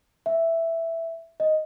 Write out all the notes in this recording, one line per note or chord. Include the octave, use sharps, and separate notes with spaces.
E5
D#5